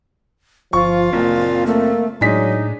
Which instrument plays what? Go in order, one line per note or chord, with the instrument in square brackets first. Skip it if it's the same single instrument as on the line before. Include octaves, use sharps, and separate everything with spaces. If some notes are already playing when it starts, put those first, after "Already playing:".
[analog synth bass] G1 [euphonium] F3 [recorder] F4 [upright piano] C#6
[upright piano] F#1 [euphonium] A#2 [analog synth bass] C4
[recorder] A3 [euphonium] A#3
[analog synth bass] A2 [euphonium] F#3 [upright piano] G#3 D4 B6 [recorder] D#4